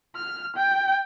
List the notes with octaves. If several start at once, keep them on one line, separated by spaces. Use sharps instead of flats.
F6
G5